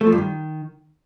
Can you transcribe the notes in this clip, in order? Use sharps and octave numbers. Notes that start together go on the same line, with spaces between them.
A3
F3
G2
D#3